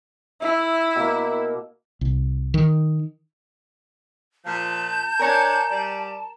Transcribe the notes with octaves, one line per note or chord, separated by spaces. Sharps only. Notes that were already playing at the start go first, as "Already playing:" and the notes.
E4 E5
B2 A#3
C2
D#3
A#2 F3 A5 G6
D4 A#4 C#5 D5 G#5 A#5
G3 D5